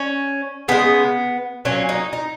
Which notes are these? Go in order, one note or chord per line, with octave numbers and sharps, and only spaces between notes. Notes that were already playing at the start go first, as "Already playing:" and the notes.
Already playing: C#4
C#3 G#3 B3
A#2 F#3 A#3 C#4
D#4
D#4